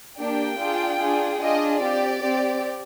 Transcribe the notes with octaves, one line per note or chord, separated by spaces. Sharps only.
A#3 D4 G4 G5
D4 F4 G#4
D4 F4 G#4
D4 F4 G#4 D#5
C4 G4 D5
C4 G4